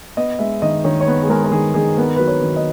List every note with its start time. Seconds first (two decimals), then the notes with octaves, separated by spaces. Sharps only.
0.17 B3 D#5
0.39 G#3 E5
0.62 D#3 D#5
0.84 D#3 C#5
1.01 C#5
1.07 B3 B4
1.22 G#4
1.29 G#3 A#4
1.44 A#4
1.51 D#3 G#4
1.74 D#3 G#4
1.97 B3 A#4
2.16 F#3 B4
2.28 C#5
2.42 D#3
2.56 D#5